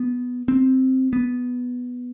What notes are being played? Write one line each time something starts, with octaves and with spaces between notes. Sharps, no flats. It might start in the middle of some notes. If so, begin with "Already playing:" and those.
Already playing: B3
C4
B3